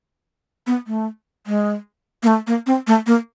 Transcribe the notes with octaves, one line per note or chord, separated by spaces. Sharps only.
B3
A3
G#3
A#3
A3
A#3
C4
A3
A#3